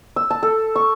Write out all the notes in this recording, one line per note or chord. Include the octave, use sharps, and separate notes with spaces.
E6
A5
A4
C#6